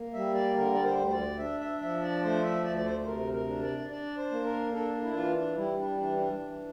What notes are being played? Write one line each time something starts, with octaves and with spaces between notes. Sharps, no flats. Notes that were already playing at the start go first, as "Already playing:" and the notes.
Already playing: A#3
G3 E5
D5
D3 A#4
D5
C5
D2
C5
D5
D4 E5
E5
F3 E5
D5
A3 C5
E5
D2 D5
D5
C5
C5
C3 A#4
A#4
D4
D5
D4 D5
C5
A#3
A#4
D4 A4
E4
E3 F4
D4
G3 E4
D4
E3 D4
D4
E3